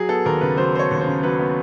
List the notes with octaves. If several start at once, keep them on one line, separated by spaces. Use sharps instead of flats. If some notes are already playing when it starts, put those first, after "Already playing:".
Already playing: F#3 G#4
B3 A4
D#2 A#4
C#3 B4
F#3 C5
B3 C5 C#5
D#2
C5
C#3
F#3 B4
B3